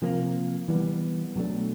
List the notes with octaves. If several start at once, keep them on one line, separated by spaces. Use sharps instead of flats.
C3 F3 A#3
E3 G3 B3
B2 F#3 A3 D4